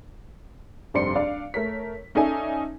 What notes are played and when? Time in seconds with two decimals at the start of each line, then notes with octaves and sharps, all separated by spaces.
0.94 F1 G2 C4 D5 C6 C#7
1.15 D4 D5 F5
1.54 A3 A#4 C#5 B6
2.15 C#4 D#4 A4 D5 E5 G#5